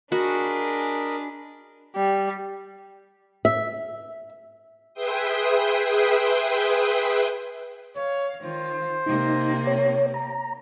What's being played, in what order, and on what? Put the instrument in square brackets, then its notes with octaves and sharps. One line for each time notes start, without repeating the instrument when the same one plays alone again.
[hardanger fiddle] D4 G#4 [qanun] F#4 [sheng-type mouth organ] A#4 D#5 B5
[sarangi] G3
[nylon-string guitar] E5
[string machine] G#4 B4 E5 G5 C6 D#6
[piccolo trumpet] C#5 [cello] F5
[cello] D#3 F4 [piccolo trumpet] C5
[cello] C3 A#3 [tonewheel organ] D#4
[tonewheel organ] C#5
A#5